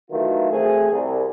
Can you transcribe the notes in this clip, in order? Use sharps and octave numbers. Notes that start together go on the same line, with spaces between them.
D#3 E3 F#3 A3 F4
A3 C4 G#4
C2